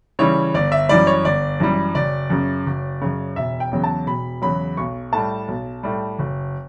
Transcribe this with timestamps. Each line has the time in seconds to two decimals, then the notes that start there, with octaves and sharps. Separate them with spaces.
0.19 C#3 E3 G3 C#5
0.54 G1 D5
0.72 E5
0.89 F#2 E3 G3 D5
1.07 C#5
1.24 G1 D5
1.60 F#2 E3 G3
1.95 F#1 D5
2.30 F#2 C#3
2.66 F#1
3.01 F#2 C#3
3.36 E1 E5
3.60 G5
3.72 E2 C#3 F#3
3.84 A5
4.07 E1 B5
4.42 E2 C#3 F#3 B5
4.77 B1 C#6
5.12 A2 G3 A5
5.48 B1
5.83 A2 G3
6.19 F#1